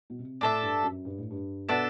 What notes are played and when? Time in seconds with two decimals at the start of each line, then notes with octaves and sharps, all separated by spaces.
0.10 B2
0.19 C3
0.41 A2 D4 A4 E5
0.62 G2
0.83 F#2
1.05 G2
1.18 A2
1.30 G2
1.69 B2 B3 D4 A4 E5